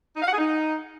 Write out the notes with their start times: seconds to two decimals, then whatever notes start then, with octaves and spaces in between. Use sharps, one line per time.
0.16 D#4
0.22 F5
0.27 F#5
0.32 G#4
0.37 D#4